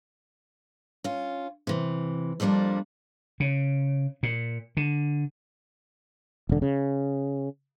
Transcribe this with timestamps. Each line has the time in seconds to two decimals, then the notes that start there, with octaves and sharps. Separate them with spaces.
1.04 C#4 F4
1.67 C3 E3
2.40 F2 F3 G3 A#3 D4
3.40 C#3
4.23 A#2
4.77 D3
6.49 E1 D3
6.62 C#3